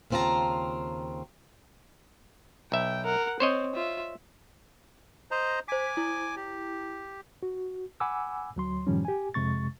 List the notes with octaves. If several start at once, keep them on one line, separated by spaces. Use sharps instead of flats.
D#2 C#3 C4 F4 A5 A#5
B1 E5 G5
A#4 F#5
C4 C5 C#5 D#5
F4 E5
C5 D#5 A#5
C5 G#5 D6 B6
E4
G4
F#4
F#5 G#5 B5 D6 E6
D2 F#3 C6
F#2 A2 D#3 F3 G3 C#4
G4 G#5
F2 C3 G#3 C#6 A6